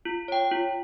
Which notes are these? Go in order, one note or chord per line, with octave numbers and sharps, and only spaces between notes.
F4
C#5 G5
F4